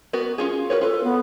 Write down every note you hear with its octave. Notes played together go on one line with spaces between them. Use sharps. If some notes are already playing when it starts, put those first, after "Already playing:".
B3 F#4 A#4
C#4 F4 G#4
F#4 A#4 B4 C#5
F4 A4 B4
B3